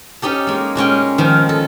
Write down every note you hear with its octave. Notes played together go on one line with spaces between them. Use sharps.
C#4 D#4 G4 A4
G#3 A#3
A#2 G#3 C#4 G5
D#3 F3
A4